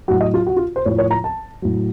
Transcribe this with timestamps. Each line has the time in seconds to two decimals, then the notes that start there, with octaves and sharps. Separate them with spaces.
0.08 A2 F#3 F#4
0.21 D#5
0.34 F4
0.47 F#4
0.57 F4
0.76 C5
0.85 A2 F3 C#5
0.98 C#5
1.11 A#5
1.24 A5
1.62 A2 F#3